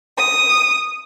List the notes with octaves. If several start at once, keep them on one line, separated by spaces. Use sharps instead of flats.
D#6